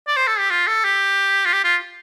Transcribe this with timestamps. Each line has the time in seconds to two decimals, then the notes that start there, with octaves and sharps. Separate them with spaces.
0.08 D5
0.17 C5
0.27 A4
0.39 G4
0.51 F4
0.68 A4
0.84 G4
1.46 F4
1.53 G4
1.64 F4